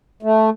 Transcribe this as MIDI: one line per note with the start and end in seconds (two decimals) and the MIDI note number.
0.23 0.50 57